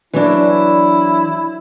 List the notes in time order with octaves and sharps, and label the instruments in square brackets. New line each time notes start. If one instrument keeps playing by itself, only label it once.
[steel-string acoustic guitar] E3 F#3 D4 [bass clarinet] E4